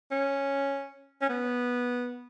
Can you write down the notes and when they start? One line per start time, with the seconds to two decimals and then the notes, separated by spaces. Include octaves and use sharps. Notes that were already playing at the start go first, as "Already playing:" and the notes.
0.11 C#4
1.21 C#4
1.29 B3